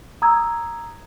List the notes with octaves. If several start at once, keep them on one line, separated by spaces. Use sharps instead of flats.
A#5 D#6 E6 G#6